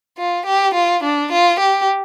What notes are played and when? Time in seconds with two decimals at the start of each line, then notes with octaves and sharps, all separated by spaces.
0.18 F4
0.46 G4
0.74 F4
1.04 D4
1.32 F4
1.60 G4